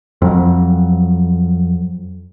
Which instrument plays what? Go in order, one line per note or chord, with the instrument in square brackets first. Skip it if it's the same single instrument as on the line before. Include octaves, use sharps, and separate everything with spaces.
[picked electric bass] F2 F#3